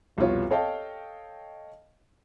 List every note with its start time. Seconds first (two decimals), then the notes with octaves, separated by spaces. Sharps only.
0.17 F1 C2 B2 B3 F4 C#5
0.50 A4 C#5 D#5 F5 G5 A5